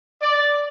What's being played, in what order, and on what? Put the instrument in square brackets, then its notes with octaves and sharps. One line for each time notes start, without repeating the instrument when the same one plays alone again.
[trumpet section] D5